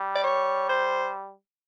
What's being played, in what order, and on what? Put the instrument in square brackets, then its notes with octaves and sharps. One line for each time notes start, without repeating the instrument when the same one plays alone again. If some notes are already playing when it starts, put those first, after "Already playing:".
Already playing: [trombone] G3
[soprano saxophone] D5
C#5
C5